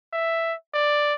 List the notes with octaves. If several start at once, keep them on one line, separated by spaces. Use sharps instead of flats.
E5
D5